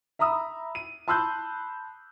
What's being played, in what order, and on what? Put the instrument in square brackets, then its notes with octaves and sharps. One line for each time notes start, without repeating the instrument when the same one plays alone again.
[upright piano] E5 A#5 B5 D#6 E6
D#7
A5 B5 C6 E6 F#6 G6